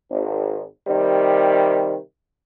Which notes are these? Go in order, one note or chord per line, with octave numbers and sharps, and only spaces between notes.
G#1
C3 D#3 G3